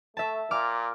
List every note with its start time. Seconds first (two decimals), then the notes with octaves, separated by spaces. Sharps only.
0.17 A3 E5 A5
0.51 A#2 D6 F6